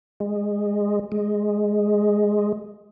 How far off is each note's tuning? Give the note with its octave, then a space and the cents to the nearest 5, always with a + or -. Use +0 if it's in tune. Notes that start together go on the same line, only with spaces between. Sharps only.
G#3 -15
G#3 +0